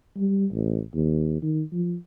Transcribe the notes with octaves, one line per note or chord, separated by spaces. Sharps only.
G3
A1
D#2
D#3
F3